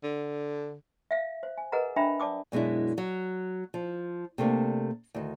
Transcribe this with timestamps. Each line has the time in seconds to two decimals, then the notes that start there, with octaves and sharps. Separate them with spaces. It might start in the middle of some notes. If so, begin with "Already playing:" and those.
0.03 D3
1.11 E5 F5
1.43 C5
1.57 G#5
1.72 G#4 A#4 B4 D#5 F#5 A#5
1.96 D4 C5 E5 G5 A#5 B5
2.20 D5 A5 D6 D#6
2.52 F#2 B2 G#3 D4 E4
2.98 F#3
3.74 F3
4.38 C3 A3 A#3 D4
5.15 D2 D#3